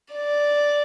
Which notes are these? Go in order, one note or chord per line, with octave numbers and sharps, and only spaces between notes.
D5